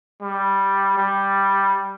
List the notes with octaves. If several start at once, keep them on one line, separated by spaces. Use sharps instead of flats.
G3
G3